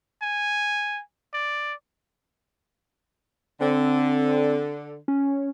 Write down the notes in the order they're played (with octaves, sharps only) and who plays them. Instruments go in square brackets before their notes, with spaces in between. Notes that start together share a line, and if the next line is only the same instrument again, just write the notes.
[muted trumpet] G#5
D5
[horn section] D3 [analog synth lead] C4
[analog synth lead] C#4